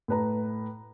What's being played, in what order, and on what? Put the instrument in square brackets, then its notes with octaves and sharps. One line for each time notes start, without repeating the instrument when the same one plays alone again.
[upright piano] A2 B4 A#5